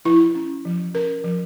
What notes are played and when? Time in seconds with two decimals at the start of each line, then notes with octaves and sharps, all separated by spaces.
0.05 F3 E4
0.35 C#4
0.65 F3
0.94 C#4 A#4
1.24 F3